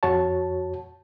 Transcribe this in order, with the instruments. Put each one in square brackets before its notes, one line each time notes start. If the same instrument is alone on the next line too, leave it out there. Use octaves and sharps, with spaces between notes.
[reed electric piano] F2 F#4 C#5 A5